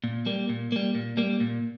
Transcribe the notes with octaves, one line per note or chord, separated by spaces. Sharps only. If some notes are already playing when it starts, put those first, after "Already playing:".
A#2
G3 A#3
A#2
G3 A#3
A#2
G3 A#3
A#2